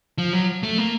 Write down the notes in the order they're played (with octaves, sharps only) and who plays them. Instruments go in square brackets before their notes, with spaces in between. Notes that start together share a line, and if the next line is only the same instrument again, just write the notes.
[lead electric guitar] F3
F#3
A3
A#3